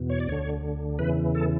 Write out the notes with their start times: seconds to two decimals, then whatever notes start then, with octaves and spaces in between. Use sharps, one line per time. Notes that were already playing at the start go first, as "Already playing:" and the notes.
Already playing: E2 B2
0.10 C#5
0.20 D5
0.27 D2 D3 C#5
0.99 E2 C#3 E3 B4
1.35 A4